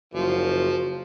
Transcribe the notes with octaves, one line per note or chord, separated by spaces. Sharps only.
F#1 F3 F#4